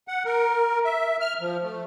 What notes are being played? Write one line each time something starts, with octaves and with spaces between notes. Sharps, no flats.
F#5
A#4
E5
F6
F3
A3